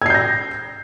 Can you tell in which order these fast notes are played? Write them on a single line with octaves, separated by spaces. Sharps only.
G#6 C7 G6 A#6